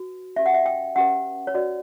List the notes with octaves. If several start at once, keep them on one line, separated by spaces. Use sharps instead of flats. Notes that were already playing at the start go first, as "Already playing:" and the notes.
Already playing: F#4 B4
C#4 G4 B4 E5
F#5
E5
G5
C#4 G4 B4 F#5
C#5
F#4 B4 D5